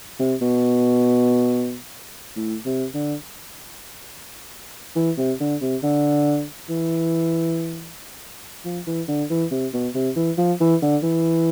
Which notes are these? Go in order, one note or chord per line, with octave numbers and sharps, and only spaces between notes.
C3
B2
A2
C3
D3
E3
C3
D3
C3
D3
E3
F3
E3
D3
E3
C3
B2
C3
E3
F3
E3
D3
E3